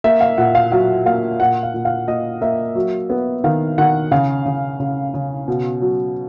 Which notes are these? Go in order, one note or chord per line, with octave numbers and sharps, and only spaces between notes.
A#3 E5
F5
A#2 F#5
F5
F#3 F5
A#3 F5
A#2 F#5
F5
A#2
F5
A#2 D#5
A#3 E5
F#3
B3
D#3 F5
D#3 F#5
C#3 F5
C#3
C#3
C#3
B2
F#3